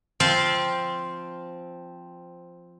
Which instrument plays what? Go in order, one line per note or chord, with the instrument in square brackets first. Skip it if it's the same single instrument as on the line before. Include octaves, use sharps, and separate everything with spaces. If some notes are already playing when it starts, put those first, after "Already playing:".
[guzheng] F3 C4 F5